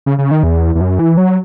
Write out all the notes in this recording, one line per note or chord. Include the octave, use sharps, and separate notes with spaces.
C#3
C#3
D#3
E2
E2
F#2
E3
F#3